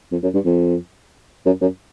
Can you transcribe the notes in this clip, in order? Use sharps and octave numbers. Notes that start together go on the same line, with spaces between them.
F2
F#2
G2
F2
F#2
F#2